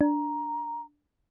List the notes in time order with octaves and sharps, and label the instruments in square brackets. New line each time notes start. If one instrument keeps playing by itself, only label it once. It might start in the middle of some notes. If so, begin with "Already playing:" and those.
[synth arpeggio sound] D4 [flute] A#5